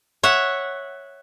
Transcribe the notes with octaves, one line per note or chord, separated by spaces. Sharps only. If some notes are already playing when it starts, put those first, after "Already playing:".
C#5 E5 F#5